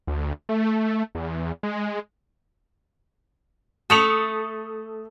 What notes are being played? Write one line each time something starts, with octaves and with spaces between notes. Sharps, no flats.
D2
A3
E2
G#3
A3 A4 D#6 C#7 F7